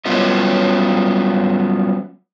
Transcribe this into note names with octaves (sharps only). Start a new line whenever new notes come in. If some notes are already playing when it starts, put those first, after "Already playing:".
F#3 G3 B3 C#4 F4 D#5